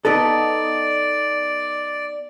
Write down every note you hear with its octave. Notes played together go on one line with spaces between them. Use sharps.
B3 D#4 A4 D5